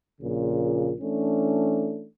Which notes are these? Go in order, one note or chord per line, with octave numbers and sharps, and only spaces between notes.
A#1 A#2 C#3
E3 A3 C#4 D4